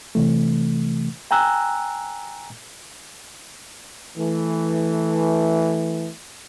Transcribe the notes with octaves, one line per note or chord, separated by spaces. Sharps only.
C3 E3 A3
G5 G#5 A#5 E6 F#6
E3 A3